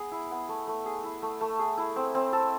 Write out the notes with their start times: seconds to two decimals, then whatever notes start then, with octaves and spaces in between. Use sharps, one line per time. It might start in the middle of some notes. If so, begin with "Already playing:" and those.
Already playing: B3 G#4
0.12 E4
0.31 B3
0.49 A3
0.67 A3
0.86 G#4
1.04 E4
1.22 A3
1.41 A3
1.59 G#4
1.78 E4
1.96 C4
2.15 C4
2.33 A4